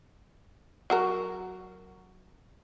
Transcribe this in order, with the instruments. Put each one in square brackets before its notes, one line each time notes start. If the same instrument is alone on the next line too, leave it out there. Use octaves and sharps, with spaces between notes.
[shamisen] F#3 F#4 A#4